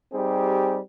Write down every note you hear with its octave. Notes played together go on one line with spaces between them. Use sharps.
G3 C4 D#4 G4 G#4